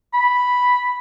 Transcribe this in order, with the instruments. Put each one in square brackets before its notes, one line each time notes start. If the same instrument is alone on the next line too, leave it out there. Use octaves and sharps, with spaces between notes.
[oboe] B5